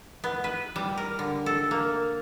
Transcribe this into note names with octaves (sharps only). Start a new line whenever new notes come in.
B3
B4
G3
A#4
D3
A4
A#3